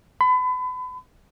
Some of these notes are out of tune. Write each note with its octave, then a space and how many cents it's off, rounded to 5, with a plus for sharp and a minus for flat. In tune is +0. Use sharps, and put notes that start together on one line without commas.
B5 +35